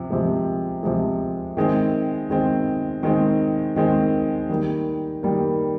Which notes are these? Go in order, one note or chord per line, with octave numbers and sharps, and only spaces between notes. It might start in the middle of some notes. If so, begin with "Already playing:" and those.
Already playing: C3 F3
C3 F3 G#3
C3 F3 G#3
D#3 G#3 C4
D#3 G#3 C4
D#3 G#3 C4
D#3 G#3 C4
D#3 G3 A#3
D#3 G3 A#3